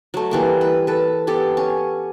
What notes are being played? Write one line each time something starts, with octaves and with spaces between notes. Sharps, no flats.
F#3 A3
E3 G3 A#3
B4
A4 B4
B3 G4 A4
C#4